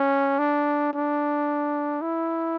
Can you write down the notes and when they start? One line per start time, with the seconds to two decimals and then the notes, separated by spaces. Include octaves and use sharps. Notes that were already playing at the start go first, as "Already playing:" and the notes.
Already playing: C#4
0.39 D4
0.93 D4
2.01 E4